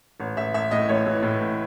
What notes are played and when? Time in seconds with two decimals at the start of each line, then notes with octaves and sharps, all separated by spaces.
0.20 A1
0.37 A1 E5
0.54 A1 E5
0.71 A2 D#5
0.89 A1 C#5
1.06 E3
1.23 A2
1.41 A1